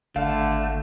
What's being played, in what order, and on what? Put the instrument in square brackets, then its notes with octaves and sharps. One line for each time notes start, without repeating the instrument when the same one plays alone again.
[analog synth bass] G#1 [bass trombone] D3 [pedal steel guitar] A3 [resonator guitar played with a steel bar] F5